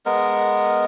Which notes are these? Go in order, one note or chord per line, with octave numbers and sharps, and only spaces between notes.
G#3 B3 A#4